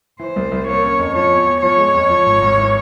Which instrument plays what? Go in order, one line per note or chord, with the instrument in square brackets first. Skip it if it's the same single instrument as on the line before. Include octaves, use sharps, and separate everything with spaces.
[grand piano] E3 [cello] C5
[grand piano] C2
C2
[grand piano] A#3 [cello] C#5
[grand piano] C#4
F2
[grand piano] F3 [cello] C#5
[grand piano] E2
E2
[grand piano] F3 [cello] C#5
[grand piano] G#3
F2
F3
G#1
G#1
E3